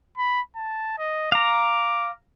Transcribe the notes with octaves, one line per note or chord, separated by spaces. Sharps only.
B5
A5
D#5
F5 A#5 D6